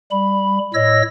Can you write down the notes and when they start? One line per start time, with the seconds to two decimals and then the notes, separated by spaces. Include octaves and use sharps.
0.11 G3 B5
0.74 A2 C#5 D#5 E6 A#6